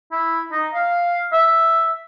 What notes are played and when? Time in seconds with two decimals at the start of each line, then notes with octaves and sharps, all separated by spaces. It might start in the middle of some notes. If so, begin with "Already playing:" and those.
0.12 E4
0.52 D#4
0.74 F5
1.32 E5